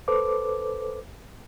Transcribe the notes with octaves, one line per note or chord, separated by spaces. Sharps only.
A4 B4 C5 D6